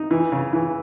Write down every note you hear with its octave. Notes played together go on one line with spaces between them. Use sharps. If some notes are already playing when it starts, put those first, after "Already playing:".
Already playing: D#4
E3
C#3
E3